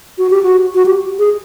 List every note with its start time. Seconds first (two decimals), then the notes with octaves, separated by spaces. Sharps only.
0.18 F#4
0.30 G4
0.43 F#4
0.75 F#4
0.86 G4
1.19 G#4